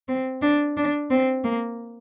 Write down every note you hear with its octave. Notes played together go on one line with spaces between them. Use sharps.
C4
D4
D4
C4
A#3